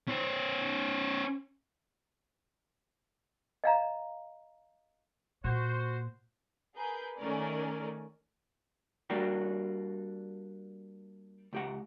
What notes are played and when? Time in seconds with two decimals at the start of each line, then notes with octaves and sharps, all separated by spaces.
0.08 C#4 C5
3.64 D#5 F5 A#5
5.44 A#2 F#4 C5
6.77 G#4 A#4 B4 G6
7.19 D#3 A3 C#4 A#4 D5
9.10 G3 A#3 D4 F#4 G4
11.53 C#2 G4 F#5